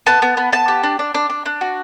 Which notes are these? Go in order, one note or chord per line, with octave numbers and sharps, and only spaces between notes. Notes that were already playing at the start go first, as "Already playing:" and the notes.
B3 A5
B3
B3
B3 A5
G4
D4
D4
D4
D4
D4
F#4